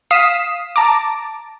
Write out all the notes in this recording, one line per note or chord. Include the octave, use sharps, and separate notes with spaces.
F5 D#6 B6 C7 E7
A5 A#5 D6